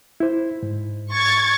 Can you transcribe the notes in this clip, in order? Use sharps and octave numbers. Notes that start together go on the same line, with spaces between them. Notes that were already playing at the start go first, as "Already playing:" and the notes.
E4 C5
G#2
C#6 G#6 A6